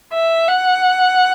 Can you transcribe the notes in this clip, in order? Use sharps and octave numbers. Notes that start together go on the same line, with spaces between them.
E5
F#5